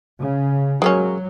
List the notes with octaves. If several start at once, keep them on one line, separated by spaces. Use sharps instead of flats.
C#3
F#3 G#3 A#3 C#4